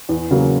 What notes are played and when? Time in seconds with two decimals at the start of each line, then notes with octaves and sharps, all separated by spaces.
0.09 E2
0.31 C#3 F#3 A#3